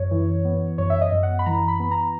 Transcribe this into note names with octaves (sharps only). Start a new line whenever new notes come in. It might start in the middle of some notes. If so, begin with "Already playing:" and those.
Already playing: F#2 C#5
E3
B3
F#2 C#5
E5
D#5
F#2
F#5
B5
E3 A#5
B5
B3
A#5